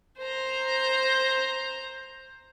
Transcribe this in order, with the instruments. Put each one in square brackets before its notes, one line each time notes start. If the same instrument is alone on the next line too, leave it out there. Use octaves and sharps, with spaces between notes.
[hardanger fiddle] C5 A#5